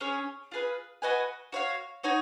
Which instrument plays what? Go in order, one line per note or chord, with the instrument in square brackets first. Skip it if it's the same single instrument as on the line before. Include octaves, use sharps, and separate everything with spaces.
[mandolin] C#4 G#4 C#5
F4 G#4 B4
F#4 B4 D#5 G#5
F#4 C#5 F5
D#4 F#4 C#5 G#5